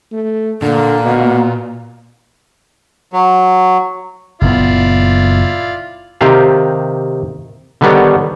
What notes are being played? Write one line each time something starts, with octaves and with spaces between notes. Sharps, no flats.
A3
A#2 D3 A#3
B2
F#3
F#1 A#2 B3 E4 F4 D5
C3 D#3 G4 F5 A5
D3 D#3 G3 B3 D4 C#5